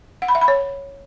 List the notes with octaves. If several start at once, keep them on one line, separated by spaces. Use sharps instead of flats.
F#5
B5
E5
B5
C#5